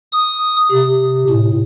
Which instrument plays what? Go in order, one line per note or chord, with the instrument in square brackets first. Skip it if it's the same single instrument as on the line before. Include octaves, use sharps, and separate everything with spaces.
[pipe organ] D#6
C3
A2